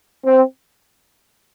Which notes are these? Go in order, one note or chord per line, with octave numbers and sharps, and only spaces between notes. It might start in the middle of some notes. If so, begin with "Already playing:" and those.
C4